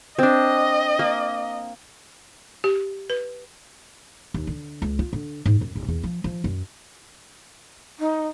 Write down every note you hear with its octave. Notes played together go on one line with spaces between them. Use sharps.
C4 D4 D#5
A#3
G4
B4
D#2
D3
C#2
F4
D3
G#2
F#2
D1
E2
F3
F3
F#2
D#4